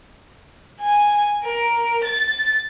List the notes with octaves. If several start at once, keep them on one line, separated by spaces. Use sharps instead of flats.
G#5
A#4
A6